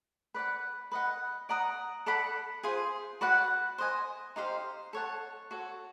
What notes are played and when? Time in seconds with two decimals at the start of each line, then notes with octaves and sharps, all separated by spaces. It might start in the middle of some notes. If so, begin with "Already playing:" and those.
0.34 B4 D5 F#5
0.92 B4 D#5 F#5
1.49 D5 F#5 A#5 D#6
2.06 A4 D5 F#5 B5
2.63 F4 G#4 C5
3.21 F#4 B4 D5 F#5
3.78 C5 D#5 G#5
4.36 D#4 G4 C5 F5
4.93 A4 C#5 F#5 A5
5.51 F#4 A4 C#5